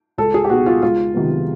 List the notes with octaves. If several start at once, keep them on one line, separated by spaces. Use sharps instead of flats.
C#2 A4
G#4
G4
B2 G#3 B3 F#4
F4
C#2 F4
C3 D#3 F#3 B3